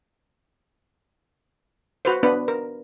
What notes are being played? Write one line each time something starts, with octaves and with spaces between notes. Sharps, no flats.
F#4 B4 C5
B3 D4 B4
A#4